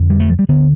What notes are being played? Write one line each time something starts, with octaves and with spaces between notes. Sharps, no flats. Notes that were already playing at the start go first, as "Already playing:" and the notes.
Already playing: F2 D3
G3
A3
F3
G3
D2 D3 B3